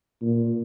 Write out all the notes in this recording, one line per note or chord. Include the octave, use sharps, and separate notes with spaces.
A#2